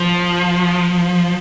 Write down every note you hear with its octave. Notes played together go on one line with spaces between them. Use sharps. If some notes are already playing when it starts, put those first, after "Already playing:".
Already playing: F3